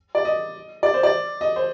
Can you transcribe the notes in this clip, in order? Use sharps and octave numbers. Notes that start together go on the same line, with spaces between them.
D5
D#5
D5
C5
D5
D#5
C5